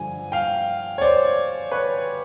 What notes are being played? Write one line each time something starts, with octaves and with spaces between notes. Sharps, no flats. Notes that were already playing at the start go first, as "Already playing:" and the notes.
Already playing: G2 D3 F3 G#5
F5 G5
C#5
C5 D5
B4 C#5